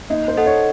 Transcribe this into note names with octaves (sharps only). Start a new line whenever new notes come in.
A#3 D#4
C5
D#4 A4 D#5 F#5
C#5